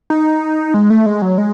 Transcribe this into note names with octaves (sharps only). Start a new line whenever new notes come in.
D#4
G#3
A3
G#3
F#3
G#3